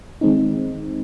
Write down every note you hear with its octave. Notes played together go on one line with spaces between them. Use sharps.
D#3 G#3 C4 D#4